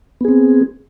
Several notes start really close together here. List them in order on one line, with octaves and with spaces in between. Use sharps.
B3 G#4 C4